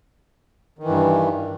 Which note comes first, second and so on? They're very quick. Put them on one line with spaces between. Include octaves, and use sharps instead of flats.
D#3 E3 G2